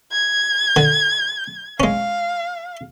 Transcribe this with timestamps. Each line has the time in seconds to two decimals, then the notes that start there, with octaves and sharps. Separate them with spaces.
0.12 G#6
0.76 D3
1.80 G#3 C#4 F5